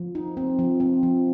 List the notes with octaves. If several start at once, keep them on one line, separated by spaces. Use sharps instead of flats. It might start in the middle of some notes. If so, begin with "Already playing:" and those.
Already playing: F3
D#4
C4
F3
C4
F3